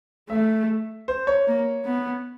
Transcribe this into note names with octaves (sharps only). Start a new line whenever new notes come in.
A3 E5
C5
C#5
A#3
B3